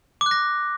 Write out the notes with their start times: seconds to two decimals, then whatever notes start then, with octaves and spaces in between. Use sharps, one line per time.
0.21 D6
0.26 F#6
0.31 A#6